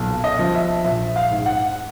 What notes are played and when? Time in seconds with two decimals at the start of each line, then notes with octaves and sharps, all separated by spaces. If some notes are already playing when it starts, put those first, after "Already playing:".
Already playing: B1 A#2
0.24 D#5
0.39 F3
0.54 E5
0.85 A#1 E5
1.16 F5
1.31 G#2
1.46 F#5